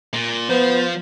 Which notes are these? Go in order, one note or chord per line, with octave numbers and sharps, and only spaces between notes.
A#2
F3 B3 C5